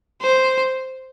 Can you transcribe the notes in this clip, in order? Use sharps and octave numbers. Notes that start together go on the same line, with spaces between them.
C5